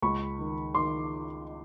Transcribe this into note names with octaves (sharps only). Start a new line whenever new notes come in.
C#2 B5 C#6
D#3
D#3 C6 D6